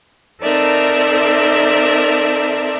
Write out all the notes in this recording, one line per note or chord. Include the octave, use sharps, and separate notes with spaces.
C4 D#4 A4 A#4 D5 E5